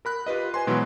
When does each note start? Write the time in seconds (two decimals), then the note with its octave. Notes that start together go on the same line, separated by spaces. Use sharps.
0.05 A#4 B5 F#6
0.26 F4 G4 B4 D#5
0.54 C5 G#5 C6
0.67 B2 E3 F#3 G#3